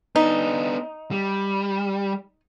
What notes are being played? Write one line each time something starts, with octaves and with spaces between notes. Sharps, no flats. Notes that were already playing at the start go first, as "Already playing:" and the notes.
B3 D4 D#4
G3